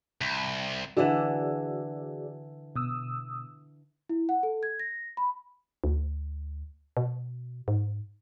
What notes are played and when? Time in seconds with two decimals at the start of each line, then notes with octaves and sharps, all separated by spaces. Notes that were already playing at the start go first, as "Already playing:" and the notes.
0.21 C2
0.97 D3 E3 F#4 G#4 D5
2.76 B2 D#6 E6
4.09 E4
4.29 F#5
4.43 A4
4.63 G#6
4.79 A#6
5.17 B5
5.84 D2
6.97 B2
7.68 G#2